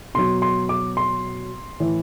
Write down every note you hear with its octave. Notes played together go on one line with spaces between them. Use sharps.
B2 F#3 C6
C6
D6
C6
A2 E3